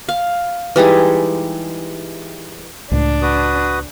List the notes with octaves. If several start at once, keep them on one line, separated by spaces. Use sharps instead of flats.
F5
E3 G3 G#3 D#4
C#2 A2 D4
F#4 B4 D#6